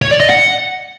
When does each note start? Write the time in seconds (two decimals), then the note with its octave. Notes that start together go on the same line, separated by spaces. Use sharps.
0.02 C#5
0.11 D5
0.20 D#5
0.30 F#5